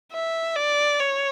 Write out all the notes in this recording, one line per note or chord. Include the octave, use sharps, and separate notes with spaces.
E5
D5
C#5